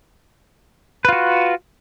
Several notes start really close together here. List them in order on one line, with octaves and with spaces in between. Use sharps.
B4 F4 F#4